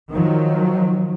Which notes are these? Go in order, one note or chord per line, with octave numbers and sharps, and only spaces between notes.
D#3 F3 F#3